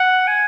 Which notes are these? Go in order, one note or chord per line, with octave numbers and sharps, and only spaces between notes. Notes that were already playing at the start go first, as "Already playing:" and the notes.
Already playing: F#5
G#5